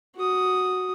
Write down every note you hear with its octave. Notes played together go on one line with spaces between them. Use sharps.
F#4 D#6